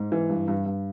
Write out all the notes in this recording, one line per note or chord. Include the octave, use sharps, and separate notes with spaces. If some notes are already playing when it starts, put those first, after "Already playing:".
Already playing: G#2
E3
G2
G2
G2